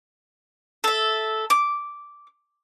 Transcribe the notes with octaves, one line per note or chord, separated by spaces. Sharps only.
A4 E5
D6